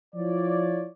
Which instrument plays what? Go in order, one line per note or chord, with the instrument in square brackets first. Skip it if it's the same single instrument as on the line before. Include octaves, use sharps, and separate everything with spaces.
[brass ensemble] F3 E4 F4 C#5 D5